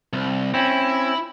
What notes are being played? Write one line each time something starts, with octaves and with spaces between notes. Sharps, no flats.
C2
C4 C#4 E4